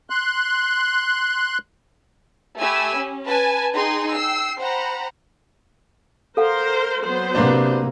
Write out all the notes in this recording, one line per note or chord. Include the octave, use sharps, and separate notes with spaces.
C6 F#6
A3 G4 G#5 B5 E6
C#4
B4 G#5 A5
D#4 G#4 G5 C6
G5 E6 C7
C5 F#5 G5 A#5 B5
A4 A#4 C5 F5 F#5
F#3 B3 C5 C6
C3 A#3 D4 B4